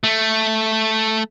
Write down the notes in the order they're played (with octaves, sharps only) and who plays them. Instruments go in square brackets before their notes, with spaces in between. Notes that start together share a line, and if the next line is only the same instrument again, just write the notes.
[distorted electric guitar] A3